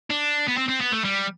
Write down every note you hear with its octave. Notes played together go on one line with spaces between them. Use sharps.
D4
B3
C4
C4
B3
A3
G3